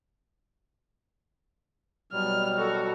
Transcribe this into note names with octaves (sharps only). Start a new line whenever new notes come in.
B2 F#3 G3 F6
F#4 A4